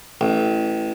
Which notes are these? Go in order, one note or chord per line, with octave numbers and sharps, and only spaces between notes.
A1